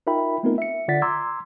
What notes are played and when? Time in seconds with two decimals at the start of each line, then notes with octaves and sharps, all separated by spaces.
0.07 D#4 F4 A#4 E5 G5 B5
0.43 A3 B3 C4 D#4 F4 A#4
0.58 E5 C#7
0.88 D3 F4 D5 F#5 A6 B6
1.02 A#5 C6 D6 E6 G#6